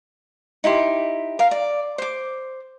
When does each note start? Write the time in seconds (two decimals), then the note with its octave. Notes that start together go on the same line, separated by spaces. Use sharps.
0.64 D#4 E4 G4 C6
1.39 A#4 F5
1.51 D5
1.98 C5 D6